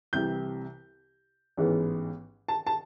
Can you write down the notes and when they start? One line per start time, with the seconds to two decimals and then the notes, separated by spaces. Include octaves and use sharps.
0.13 C2 C3 E3 G6
1.57 A1 G#2 E3 G#3 B3
2.48 A5
2.67 A5